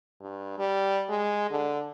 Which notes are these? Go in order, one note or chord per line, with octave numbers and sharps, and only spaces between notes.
G2
G3
G#3
D3